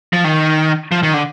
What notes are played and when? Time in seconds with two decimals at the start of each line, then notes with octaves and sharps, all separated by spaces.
0.13 F3
0.24 D#3
0.92 F3
1.03 D#3
1.14 D3